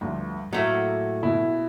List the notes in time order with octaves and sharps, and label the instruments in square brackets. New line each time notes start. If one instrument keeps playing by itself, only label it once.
[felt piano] D2 F3 [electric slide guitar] G2
[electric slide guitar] A2 [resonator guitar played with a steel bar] F#3 A3 A#3 [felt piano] F#5
[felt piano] B2 [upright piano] E4